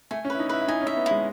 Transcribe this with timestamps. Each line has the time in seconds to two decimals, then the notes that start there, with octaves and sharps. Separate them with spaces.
0.11 A3 G#5
0.25 C#4
0.30 B4
0.35 E4
0.40 D#4
0.49 E4 B4
0.62 E4
0.68 D#4 G#5
0.82 C#4
0.87 E5
0.97 B3
1.06 E4
1.11 G#3